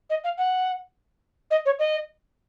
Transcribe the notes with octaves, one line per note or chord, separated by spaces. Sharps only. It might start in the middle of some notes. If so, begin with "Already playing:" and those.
D#5
F5
F#5
D#5
C#5
D#5